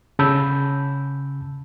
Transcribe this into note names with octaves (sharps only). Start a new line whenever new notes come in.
C#3 A5 B5 E6 G6